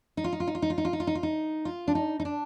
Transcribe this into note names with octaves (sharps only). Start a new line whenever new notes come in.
D#4
F4
D#4
F4
D#4
F4
D#4
F4
D#4
F4
D#4
F4
D#4
F4
D#4
F4
D4
D#4
D#4
D4